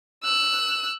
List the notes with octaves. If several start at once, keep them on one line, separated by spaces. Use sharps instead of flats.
E6 F#6